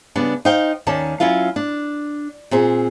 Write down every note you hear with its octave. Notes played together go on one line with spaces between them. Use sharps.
C#3 G3 B3 D4
D#4 C5 F5 G5
D#2 D#3 C#4 D5 A5
F#3 C#4 E4 F4 F5
D4
A#2 C4 G#4